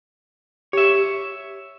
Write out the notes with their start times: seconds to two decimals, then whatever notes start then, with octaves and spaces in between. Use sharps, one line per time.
0.73 G4 C#5 E5